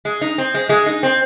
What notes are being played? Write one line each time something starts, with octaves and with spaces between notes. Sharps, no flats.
G#3
D#4
C4
G#3
G#3
D#4
C4